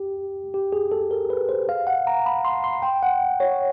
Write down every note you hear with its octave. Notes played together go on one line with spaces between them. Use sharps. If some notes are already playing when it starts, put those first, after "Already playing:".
Already playing: G4
G4
G#4
A4
A#4
B4
C5
F5
F#5
A#5
B5
C6
C6
G5
F#5
C#5